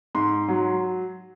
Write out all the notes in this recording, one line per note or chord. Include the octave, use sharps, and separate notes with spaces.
G#2 C6
F#3